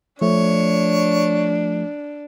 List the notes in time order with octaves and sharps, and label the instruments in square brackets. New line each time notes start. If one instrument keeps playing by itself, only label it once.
[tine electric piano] F3 A3 [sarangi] D4 [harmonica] C#5